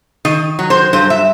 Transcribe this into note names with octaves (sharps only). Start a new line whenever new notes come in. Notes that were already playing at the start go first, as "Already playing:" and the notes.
D#3 D#5
F#3
C5
G2 C5
E5